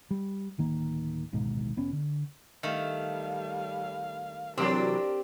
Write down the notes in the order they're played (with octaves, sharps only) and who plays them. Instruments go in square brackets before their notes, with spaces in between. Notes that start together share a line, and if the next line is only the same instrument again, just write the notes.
[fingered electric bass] G3
D1 D#3 A#3
D1 G#1 G#2 B2
F1 B3 C#4
D3
[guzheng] D#3 A3 [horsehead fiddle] G3 F5
[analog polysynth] C3 E3 F#3 [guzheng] C4 D5 [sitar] D4 G4 [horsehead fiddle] A#4